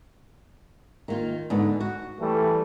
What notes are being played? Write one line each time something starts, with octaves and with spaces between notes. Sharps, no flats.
D#3 A#3 F4
G#2 D3 B3
F#4
E3 G3 A3